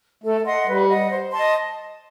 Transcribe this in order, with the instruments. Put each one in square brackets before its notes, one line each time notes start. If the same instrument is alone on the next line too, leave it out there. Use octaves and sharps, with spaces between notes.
[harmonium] A3 [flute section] A4
[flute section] D#5 F#5 C6
[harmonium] G3 [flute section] B4
[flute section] D#5 F#5
C5
D#5 A5 C6